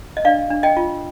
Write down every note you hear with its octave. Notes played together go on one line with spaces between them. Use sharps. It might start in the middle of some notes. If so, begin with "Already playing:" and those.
D#5
D4 D5 F5
D4
D#5 G5
F4